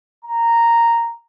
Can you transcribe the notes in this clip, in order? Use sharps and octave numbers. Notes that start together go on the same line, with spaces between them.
A#5